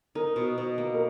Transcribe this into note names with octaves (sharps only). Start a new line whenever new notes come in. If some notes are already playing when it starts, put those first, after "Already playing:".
D#4 A#4
B2
B2
A#3
A#4